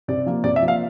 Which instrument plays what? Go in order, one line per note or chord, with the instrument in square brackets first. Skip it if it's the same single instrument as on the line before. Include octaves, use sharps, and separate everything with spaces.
[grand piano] C3 D5
F3 A#3
C3 D5
E5
F3 A#3
F5